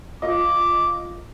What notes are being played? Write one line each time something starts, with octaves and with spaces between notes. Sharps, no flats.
F4 D#5 D6